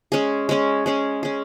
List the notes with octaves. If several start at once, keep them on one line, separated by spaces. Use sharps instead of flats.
G#3 C#4 G#4
G#3 C#4 G#4
G#3 C#4 G#4
G#3 C#4 G#4